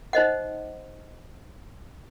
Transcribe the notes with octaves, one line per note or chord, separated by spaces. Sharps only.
D#4 C5 D#5 F#5